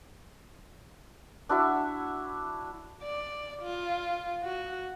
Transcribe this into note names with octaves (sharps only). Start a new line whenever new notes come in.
D4 E4 F#4 E5
D5
F4
F#4